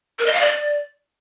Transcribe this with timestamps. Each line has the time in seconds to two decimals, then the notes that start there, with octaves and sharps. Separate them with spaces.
0.19 A#4
0.26 D#5
0.34 F5
0.41 D5